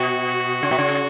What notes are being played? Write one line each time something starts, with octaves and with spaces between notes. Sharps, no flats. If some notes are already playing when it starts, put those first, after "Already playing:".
Already playing: B2 F#4
C#3
B2
C#3